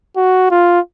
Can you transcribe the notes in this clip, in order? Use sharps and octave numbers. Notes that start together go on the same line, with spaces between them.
F#4
F4